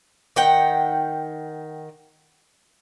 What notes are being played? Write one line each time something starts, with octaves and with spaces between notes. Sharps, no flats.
D#3 F#5 G5